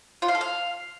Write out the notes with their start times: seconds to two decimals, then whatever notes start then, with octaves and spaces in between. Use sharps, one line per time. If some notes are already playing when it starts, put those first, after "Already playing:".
0.22 F4
0.28 F5
0.35 A4
0.41 F5